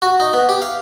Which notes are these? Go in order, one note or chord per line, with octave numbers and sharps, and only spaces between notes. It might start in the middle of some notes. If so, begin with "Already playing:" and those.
F#4
D#4
B3
G4
F5